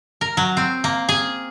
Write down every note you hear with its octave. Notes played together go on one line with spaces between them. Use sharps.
A#4
F#3
C4
A#3
G#4